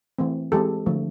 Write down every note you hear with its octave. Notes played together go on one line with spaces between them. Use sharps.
E3 A3 C4
E3 G#3 C4 G4 A4
D3 F3 A3